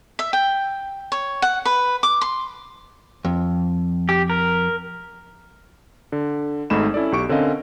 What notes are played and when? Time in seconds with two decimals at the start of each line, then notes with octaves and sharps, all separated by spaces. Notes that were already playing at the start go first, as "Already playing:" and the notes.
0.19 E5
0.33 G5
1.12 C#5
1.42 F#5
1.65 B4
2.03 D6
2.21 C6
3.25 F2
4.09 G4
4.30 A#4
6.12 D3
6.70 G#1 G#2 A3 D#4 B5 E7
6.94 C#4 E4 A4 D5
7.12 B1 G4 C#6 D7
7.29 D3 C4 C#4 A#4 D#5 F5